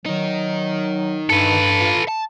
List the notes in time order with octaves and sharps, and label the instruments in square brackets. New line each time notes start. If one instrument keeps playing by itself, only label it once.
[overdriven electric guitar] D#3 D#4 [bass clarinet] F#3
[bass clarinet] G2 [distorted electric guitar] A4 B4
[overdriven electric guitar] F4
A5